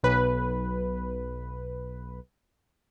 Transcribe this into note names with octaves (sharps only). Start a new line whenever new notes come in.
B1 B4